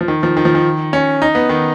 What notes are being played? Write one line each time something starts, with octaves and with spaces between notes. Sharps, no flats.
F3
D#3
F3
D#3
F3
D#3
C#4
D#4
B3
D#3